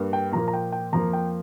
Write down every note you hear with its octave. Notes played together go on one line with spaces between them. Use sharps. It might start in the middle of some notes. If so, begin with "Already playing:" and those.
Already playing: G2 G3 A#3
G5
A#2 F3 A#3 A#5
A#5
G5
G5
F2 F3 A#3 A#5
G5